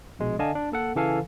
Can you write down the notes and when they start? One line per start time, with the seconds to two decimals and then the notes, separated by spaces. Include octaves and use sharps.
0.19 A#1 B2 G#3
0.39 D3 D5 D#5 F5 G#5 A5
0.55 D4
0.72 A#3 A4 F#5
0.95 C#3 E3 A4 F5 G#5